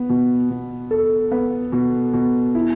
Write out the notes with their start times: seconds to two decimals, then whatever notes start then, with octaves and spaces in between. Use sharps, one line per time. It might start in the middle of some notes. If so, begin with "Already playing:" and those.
Already playing: B3
0.09 B2
0.50 B2
0.91 A4
1.32 B3
1.72 B2
2.13 B2
2.55 E4